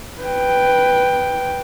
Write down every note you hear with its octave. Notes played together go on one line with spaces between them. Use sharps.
B4 G5